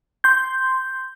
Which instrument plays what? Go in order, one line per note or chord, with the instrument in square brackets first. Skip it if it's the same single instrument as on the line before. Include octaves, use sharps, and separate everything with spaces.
[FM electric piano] C6 G6